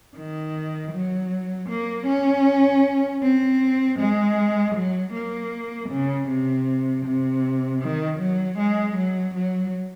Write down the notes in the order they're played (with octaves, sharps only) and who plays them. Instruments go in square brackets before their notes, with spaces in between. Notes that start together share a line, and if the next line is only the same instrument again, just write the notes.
[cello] D#3
F#3
A#3
C#4
C4
G#3
F#3
A#3
C#3
C3
C3
D#3
F#3
G#3
F#3
F#3